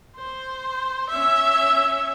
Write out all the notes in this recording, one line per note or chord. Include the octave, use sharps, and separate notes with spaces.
C5
C#4 E5